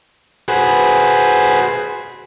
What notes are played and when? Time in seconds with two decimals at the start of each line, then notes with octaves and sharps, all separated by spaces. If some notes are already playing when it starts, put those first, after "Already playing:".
0.48 F#4 G#4 B4 C5